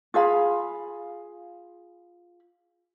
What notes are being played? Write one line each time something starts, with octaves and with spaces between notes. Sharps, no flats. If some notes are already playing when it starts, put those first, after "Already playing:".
F4 G#4 F5 B5